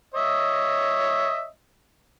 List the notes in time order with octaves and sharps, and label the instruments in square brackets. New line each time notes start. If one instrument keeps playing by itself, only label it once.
[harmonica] C#5 D#5 E5